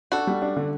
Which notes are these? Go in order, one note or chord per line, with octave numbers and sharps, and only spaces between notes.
D4 F#4 A4
G3
D4
D3